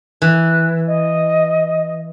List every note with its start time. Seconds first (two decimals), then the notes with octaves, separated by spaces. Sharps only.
0.22 E3 F#6
0.87 D#5